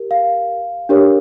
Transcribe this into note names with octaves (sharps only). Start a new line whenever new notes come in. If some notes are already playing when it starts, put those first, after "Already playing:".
Already playing: G4 A#4
F5
D4 G4 A#4 C#5